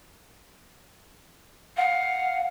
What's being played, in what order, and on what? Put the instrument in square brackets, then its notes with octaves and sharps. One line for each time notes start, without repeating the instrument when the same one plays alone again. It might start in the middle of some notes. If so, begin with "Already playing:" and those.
[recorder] F5 [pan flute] F#5